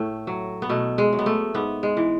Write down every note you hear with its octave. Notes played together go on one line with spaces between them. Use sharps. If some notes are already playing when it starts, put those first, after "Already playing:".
Already playing: A2 A3
F#3
B3
B2 A3
G#3
F#3
B3
A3
G#2 B3
G#3
E3